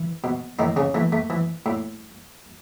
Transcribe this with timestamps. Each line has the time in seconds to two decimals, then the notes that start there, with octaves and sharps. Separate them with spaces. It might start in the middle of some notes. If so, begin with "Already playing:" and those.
Already playing: E3
0.24 B2
0.59 A2 D#3 D#4
0.76 C#3 C#4
0.94 E3 A3
1.12 A3
1.30 E3
1.66 A2